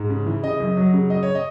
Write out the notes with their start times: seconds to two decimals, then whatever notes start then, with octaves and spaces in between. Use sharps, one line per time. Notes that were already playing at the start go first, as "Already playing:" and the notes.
Already playing: G#2
0.10 C#3
0.26 E3
0.43 C#3 D#5
0.60 F#2
0.77 F#3
0.94 C#3
1.10 F#2 D#5
1.23 C#5
1.35 D#5